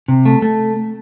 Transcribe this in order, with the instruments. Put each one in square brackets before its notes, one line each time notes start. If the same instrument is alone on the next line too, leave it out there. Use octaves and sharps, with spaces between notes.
[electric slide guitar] C3
A3
A3